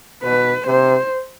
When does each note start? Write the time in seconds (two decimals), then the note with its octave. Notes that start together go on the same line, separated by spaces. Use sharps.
0.24 B2 B4
0.67 C3 C5